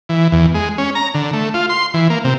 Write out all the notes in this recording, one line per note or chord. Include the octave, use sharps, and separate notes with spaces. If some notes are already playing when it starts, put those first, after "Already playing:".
E3
E2
G#3
C#4
A#5
D3
A3
F4
C6
E3
A#3
C3